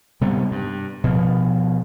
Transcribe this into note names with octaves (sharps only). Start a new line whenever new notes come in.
C3 G3 B3
G2
B2 F3